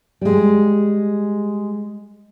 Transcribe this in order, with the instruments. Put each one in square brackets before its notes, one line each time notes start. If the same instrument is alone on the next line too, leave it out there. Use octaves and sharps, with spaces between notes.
[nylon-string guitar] G3 G#3